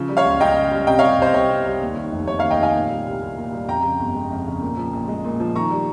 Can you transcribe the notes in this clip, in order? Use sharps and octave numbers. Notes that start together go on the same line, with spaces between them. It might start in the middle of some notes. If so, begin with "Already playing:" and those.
Already playing: C#3 F3
G3
C#5 F5
C#2
C#2 D#5 G5
C#3
G3
C3 D#5 G5
G3 C#5 F5
C2 C5 D#5
C2 C#5
C3
G3
D#2
D#3
F1
F1 C#5
D#2 C#5 F5
D#5 G5
D#3 F5 G#5
A#2
G3
C2
C2
A#2
G3
F2 G5 A#5
C#3
G1
G#3
F2
C#3
A#2
F3
A#1
G#3
A#2
F3
D#3 A#5 C#6
G3